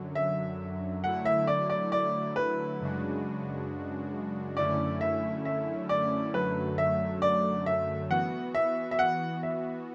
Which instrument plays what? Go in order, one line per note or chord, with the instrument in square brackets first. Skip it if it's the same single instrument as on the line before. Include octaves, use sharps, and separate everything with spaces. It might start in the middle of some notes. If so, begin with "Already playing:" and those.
Already playing: [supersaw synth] F#2 D3 F#3
[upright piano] E5
[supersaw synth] D3 F#3 A3 E4 [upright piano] F#5
[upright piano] E5
D5
D5
D5
B4
[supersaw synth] F#2 C#3 G#3 D4 F#4
[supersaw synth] F#2 D3 A3 C#4 E4 [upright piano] D5
[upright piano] E5
E5
D5
[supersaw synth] F#2 D3 F#3 A3 [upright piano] B4
[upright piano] E5
D5
E5
[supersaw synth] E3 B3 F#4 [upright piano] F#5
[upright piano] E5
E5
F#5
E5